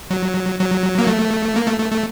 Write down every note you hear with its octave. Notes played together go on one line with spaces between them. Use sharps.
F#3
F#3
A#3
A3
A#3
A3
A3
A3